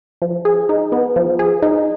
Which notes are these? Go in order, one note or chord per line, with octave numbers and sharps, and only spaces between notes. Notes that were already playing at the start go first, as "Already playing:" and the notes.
F3
G#4
D#4
B3
F3
G#4
D#4